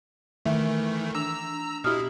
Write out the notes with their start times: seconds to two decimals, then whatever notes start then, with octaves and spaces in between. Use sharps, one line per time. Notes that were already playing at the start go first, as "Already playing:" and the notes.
0.46 D#3 E3 A3 E5
1.15 D4 A#5 E6
1.84 B2 E4 G4 D#6 F6